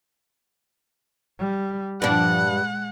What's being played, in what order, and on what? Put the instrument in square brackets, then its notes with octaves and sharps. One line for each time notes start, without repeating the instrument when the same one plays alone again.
[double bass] G3
[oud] G2 D4 [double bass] A#2 F3 [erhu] F#5
[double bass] G#3